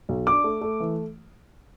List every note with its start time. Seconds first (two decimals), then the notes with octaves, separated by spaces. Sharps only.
0.09 B1
0.26 D4 D6
0.44 A3
0.61 A3
0.80 E3